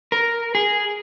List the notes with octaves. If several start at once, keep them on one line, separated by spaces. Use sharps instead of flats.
A#4
G#4